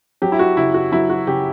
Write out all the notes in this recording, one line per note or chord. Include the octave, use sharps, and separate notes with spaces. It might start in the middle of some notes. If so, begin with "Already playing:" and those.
F#3 G4
E4
F#4
C#3 E4
F#4
F#3 E4
F#4
C#3 G4